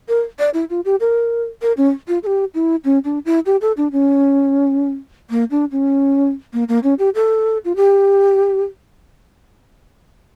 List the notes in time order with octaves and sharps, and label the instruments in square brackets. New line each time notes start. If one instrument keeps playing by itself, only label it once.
[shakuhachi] A#4
D5
E4
F4
G4
A#4
A#4
C#4
F4
A4
G4
E4
C#4
D4
E4
G4
A4
D4
C#4
A#3
D4
C#4
A#3
A#3
C#4
G4
A4
F4
G4